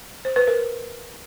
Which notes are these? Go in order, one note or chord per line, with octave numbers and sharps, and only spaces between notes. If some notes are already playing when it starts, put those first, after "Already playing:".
C5
B4
A#4